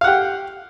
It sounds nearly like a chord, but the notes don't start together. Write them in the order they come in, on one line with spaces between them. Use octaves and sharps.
F5 F#5 G4